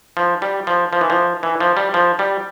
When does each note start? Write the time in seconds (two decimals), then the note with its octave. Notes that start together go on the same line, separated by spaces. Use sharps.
0.17 F3
0.42 G3
0.67 F3
0.93 F3
1.01 E3
1.10 F3
1.43 E3
1.60 F3
1.77 G3
1.94 F3
2.19 G3